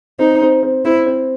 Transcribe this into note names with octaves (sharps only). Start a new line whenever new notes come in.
C4 D#4
C4
C4
C4 E4
C4